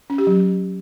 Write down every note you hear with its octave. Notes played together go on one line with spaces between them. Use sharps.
C#4
G4
F#3